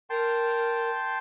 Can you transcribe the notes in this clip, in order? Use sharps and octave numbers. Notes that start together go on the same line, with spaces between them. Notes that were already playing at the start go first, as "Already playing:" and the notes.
A#4 G5 A5 C6